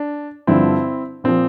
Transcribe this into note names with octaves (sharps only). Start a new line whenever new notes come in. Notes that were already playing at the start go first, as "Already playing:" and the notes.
Already playing: D4
G2 D3 F3 C4 E4
A#2 F3 C4